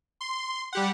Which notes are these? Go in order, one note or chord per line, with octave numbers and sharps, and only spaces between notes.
C6
G3 G4 F#5